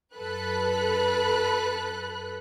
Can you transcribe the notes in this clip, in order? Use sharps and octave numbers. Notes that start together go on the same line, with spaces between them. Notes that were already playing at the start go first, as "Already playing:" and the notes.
F#2 A4 B4 B5 F#6